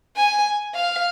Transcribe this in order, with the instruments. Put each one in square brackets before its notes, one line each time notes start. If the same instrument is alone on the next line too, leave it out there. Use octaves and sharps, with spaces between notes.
[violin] G#5
F5